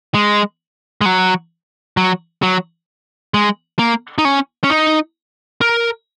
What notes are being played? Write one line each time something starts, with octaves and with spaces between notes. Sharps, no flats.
G#3
G#3
F#3
F#3
F#3
G#3
A#3
D#4
C#4
C#4
D#4
A#4